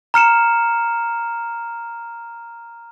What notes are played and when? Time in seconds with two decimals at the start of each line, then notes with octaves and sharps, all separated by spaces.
0.14 A#5 F6 C#7 E7